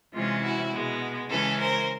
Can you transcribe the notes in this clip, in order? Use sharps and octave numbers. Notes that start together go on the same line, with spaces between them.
C3 E3 G#3 C#4 F4
E4 F#4
B2 G#3 B3
C#3 E3 G#3 C#4 A4 B4
A#4 C5